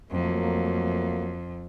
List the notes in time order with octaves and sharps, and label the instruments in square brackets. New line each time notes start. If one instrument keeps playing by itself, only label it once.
[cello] F2 [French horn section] F#3 A3 A#3